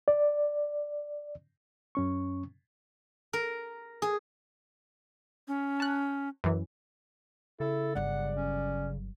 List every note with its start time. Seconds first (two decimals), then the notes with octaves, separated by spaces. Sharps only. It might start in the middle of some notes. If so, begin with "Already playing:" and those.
0.08 D5
1.95 F#2 C#4 C#6
3.33 A#4
4.02 G#4
5.48 C#4
5.80 A5 F#6
6.44 F#2 E3
7.60 C#3 E4 A4
7.95 G1 F#3 D5 F#5
8.36 C#4